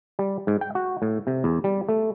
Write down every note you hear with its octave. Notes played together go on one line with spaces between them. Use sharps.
G3
G#2
G5
F#4
A2
C3
E2
G3
A3